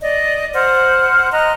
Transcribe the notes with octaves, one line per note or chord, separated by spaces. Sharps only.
D5 D#5
C5 F#5 F6
D#5 A#5 F#6